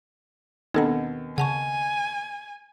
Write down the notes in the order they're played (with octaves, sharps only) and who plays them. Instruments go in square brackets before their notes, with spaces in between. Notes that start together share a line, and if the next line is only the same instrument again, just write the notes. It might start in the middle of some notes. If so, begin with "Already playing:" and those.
[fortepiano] D#2 B2 [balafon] C4 D4 [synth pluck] D#4 A4 F#5
[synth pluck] C#3 [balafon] F#5 A5 C#6 [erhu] G#5